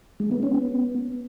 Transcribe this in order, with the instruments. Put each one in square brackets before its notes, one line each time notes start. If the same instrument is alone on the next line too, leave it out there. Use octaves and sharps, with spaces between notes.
[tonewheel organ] G#3
B3
C#4
B3